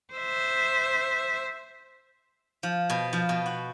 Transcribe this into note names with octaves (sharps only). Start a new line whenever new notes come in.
C5 E5
F3
B2
F3
B2
F#4